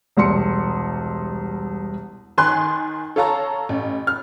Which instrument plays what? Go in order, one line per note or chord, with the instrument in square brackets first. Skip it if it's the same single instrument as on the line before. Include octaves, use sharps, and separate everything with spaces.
[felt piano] E1 C2 C6 C#7
[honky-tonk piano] D#3 G#5 C6 F#6
A4 C#5 F5 A5 A#5 C#6
A1
F6